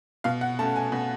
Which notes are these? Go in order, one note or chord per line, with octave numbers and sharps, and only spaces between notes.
B2 F5
F#5
A3 C#4 A5
G#5
B2